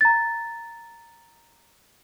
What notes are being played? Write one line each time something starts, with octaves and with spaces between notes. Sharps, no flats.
A#5 A6